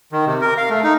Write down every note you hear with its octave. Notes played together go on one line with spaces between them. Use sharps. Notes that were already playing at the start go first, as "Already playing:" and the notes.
D#3
C3
A#4
F5
A3
D#4